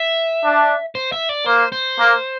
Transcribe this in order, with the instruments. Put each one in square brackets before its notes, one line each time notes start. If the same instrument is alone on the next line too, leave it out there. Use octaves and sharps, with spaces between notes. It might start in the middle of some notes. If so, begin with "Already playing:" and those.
Already playing: [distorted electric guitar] E5
[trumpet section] D4
[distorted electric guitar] C5
E5
D5
[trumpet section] A#3 [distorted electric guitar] C5
[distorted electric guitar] C5
[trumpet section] A#3